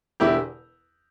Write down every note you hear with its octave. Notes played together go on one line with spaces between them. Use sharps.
E1 E2 D3 E4 G4